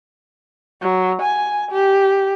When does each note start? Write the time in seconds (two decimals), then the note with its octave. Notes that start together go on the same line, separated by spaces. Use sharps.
0.82 F#3
1.22 G#5
1.71 G4